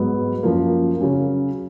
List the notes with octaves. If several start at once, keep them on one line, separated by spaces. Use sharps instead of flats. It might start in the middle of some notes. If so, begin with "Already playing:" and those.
Already playing: G#2 F#3 B3
F#2 F3 A#3
C#3 F#3 C#4